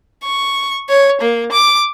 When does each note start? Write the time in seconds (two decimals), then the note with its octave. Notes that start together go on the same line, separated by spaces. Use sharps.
0.23 C#6
0.89 C#5
1.21 A#3
1.52 D6